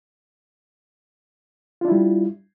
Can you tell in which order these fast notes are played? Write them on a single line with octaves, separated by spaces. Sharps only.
F4 D4 E4 G3